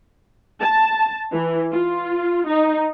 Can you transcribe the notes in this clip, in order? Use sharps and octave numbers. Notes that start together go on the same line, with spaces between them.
A5
E3
F4
D#4